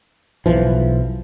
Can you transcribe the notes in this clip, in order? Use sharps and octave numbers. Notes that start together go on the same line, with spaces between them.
B1 E3 F3